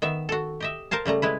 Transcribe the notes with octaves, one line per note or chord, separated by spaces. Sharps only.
D#3 B3 E5
F#4 A4
G4 D#5 E5
A#4 C5 F5 A5
C#3 G3 A3 A#5
G#3 E4 B4